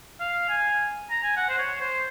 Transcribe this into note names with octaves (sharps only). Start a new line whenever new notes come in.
F5
G#5
A#5
G#5
F#5
C5
C#5
C5